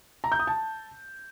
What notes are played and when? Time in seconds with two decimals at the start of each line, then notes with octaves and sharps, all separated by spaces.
0.24 A#5
0.32 G6
0.39 D#6
0.47 A5